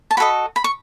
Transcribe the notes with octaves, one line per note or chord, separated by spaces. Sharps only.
A5
F#4 A4 D#5 B5
B5
C#6